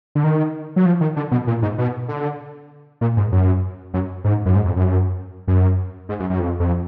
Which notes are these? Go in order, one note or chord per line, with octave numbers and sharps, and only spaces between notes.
D3
D#3
F#3
F3
D#3
D3
B2
A#2
G#2
B2
D3
A#2
G#2
F#2
F#2
G#2
F#2
G#2
F2
F#2
F#2
G#2
F#2
F#2
F2
F2